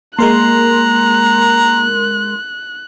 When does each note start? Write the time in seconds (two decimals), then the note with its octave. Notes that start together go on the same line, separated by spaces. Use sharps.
0.19 G#3 A#3 A#4 A#5 C6 F#6